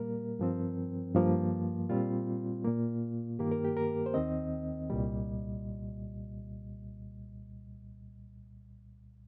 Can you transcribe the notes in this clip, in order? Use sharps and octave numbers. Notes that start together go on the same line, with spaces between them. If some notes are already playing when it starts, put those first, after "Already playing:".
Already playing: A#2 G3 A#3 A#4
G2 F3 C4
G2 F3 A#3
A#2 G3 C4 F4
A#2 A#3
G2 D#3 A#3 G4
A#4
G4
A#4
C5
D#2 D#3 C4 D#5
C2 A#2 G3